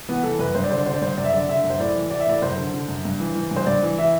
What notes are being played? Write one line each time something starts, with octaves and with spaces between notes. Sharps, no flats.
E3 B3
E3 A4
F#2 B4
G2 C5
D5
D3 C5
D5
D3 C5
D5
G2 C5
F#2 D5
E5
D3 D5
D3 E5
F#2
C5
A2 D5
E3
E3 D5
E5
A2 D5
F#2 C5
D3
D3
F#2
G2
E3
E3
G2
C5
G2 D5
E3
E3 E5